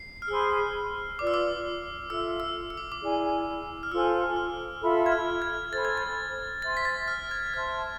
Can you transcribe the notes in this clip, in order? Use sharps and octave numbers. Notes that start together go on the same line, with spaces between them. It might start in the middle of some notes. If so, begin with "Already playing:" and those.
Already playing: C7
F6
G#4 C5 G#5 B5 E6
F4 B4 D5 D6
E6
D6
F4 A4 E5 E6
E6
E6
D6
D6
E4 G#4 D5 G#5
F6
F4 A4 C5 G#5 E6
F6
F4 A4 E5 B5
G#6
F6
G#6
A4 C5 G#5 B5 A6
G#6
A6
C5 E5 G#5 C6 A6
B6
A6
F6
G#6
G#6
C5 E5 A5 C6 F6